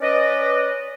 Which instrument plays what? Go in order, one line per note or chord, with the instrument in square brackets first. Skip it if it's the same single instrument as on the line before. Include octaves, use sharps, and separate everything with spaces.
[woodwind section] C#4 B4 D5 D#5